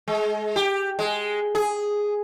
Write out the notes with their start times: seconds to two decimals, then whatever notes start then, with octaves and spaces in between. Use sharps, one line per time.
0.08 G#3
0.56 G4
0.99 G#3
1.55 G#4